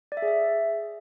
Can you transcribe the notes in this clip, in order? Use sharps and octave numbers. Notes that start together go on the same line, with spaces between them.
D5
E5
G#4
E5